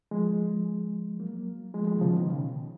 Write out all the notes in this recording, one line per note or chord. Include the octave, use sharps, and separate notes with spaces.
F3 G#3
F#3 A#3
F3 G#3
F3 G#3
D#3
C#3 F3
B2 D#3
C#3